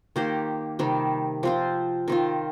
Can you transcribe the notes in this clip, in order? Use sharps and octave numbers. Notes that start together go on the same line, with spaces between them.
D#3 A#3 G4 C5
C3 D#3 G3
F3 C4 F4
D#3 C4 F4